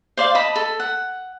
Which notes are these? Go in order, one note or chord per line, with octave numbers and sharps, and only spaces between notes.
C5 D5 F5
D#5 A5 B5
A4
F#5